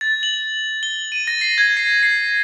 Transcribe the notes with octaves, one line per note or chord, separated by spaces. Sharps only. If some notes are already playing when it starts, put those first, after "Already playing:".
A6
F#7
G7
D#7
A#6
C7
G#6
C7
C7